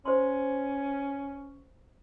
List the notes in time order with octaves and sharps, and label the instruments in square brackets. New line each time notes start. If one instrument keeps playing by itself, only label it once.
[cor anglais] C#4 [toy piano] C5 C6